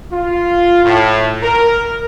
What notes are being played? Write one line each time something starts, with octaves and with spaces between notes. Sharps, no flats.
F4
A2
A#4